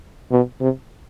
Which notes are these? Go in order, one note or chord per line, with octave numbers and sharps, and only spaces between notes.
B2
C3